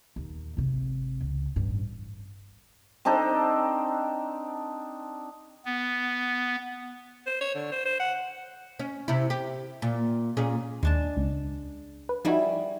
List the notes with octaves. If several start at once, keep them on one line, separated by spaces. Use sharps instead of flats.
D#2 A#2
G#1 C3
C#2
A1 G2
C4 D4 D#4 A4
B3
C5
C#5
D3
C5
C5
F#5
C#4
C3 E4
G4
A#2
A#2 C#4 G#4
D#2 G#3 D4 A5
C#2
B4
F3 G3 D#4 E4 F#4 G#4